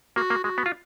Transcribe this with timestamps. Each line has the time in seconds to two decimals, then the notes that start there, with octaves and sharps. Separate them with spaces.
0.16 A#3 F#4
0.30 A#3
0.44 G#3 F#4
0.58 B3
0.66 F4